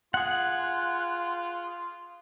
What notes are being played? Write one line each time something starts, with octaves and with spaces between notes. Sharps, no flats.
F4 G#4 F#5